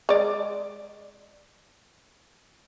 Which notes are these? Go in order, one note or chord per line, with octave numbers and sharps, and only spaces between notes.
G#3 D5